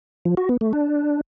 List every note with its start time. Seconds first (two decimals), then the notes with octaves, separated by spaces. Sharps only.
0.25 F3
0.37 F#4
0.49 B3
0.61 A3
0.73 D4